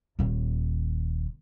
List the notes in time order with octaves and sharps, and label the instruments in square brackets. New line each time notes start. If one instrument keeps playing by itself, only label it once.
[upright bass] D#1 D#2